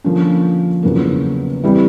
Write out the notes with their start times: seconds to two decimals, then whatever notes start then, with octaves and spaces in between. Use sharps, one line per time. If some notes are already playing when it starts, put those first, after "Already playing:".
0.04 D3 F3 A#3 C#4
0.83 E2 C#3 F#3 A#3
1.64 E3 G3 C4